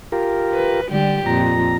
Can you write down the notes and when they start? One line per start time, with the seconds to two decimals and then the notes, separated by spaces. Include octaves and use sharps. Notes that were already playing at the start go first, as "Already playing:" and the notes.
0.12 F4 G4 A#4
0.52 B4
0.89 D3 G3 G4
1.26 F2 A#2 A#5